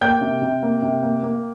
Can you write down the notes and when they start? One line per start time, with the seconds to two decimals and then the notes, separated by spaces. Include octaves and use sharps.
0.01 A#3 G5 G6
0.21 C3
0.42 C3
0.63 A#3
0.82 C3
1.03 A#3
1.23 A#3